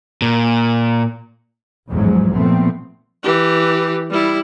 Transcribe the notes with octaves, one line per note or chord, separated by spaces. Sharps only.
A#2
A1 E2 G#2 F3 F#3 G#3
B1 A#2 F3 A3 B3 C4
E3 G4
G3 E4